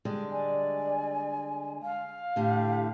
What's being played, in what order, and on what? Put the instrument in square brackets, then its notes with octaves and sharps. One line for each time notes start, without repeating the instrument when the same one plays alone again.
[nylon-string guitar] D3 G3 G#3
[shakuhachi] D5 [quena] G#5
[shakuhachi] F5
[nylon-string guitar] A2 D3 [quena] G4